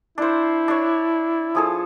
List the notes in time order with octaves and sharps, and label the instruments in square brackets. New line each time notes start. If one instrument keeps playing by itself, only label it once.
[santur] D4 C5 [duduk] E4
[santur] D4 C#5
F3 G#4 A4